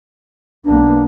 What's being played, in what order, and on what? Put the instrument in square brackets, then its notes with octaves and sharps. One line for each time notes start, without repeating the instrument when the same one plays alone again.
[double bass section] B1 A#3 B3 [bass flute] D4